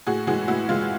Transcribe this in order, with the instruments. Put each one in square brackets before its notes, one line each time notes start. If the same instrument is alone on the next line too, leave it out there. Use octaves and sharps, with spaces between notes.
[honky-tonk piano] A2 F#4 G#4
E3 G#3 F#4 G#4
A2 E4 F#4
E3 G#3 F4